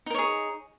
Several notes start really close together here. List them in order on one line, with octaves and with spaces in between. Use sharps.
D#4 A#4 C#5 G#4